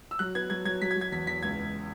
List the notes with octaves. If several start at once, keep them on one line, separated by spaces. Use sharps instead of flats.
E6
F#3 F#6
B3 G#6
F#3 G#6
F#3 G#6
F#3 B6
G#6
F#3
G#6
E2 B6
E2 B6
C#2 G#6
C#2